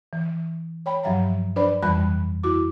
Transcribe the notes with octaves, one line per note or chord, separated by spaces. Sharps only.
E3
C#5 G5 B5
G2 F3 F#3 E5 F5 A#5
D4 B4 C5 D5 B5
F2 E3 G3 B5 F#6
E4 F#4 D6